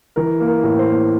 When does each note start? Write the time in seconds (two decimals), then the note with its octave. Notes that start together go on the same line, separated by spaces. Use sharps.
0.16 E3 A#4
0.40 A#3
0.47 A#4
0.63 A2
0.79 C5
0.87 A#3